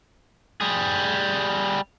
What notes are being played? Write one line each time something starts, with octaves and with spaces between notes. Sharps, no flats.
G3 G#4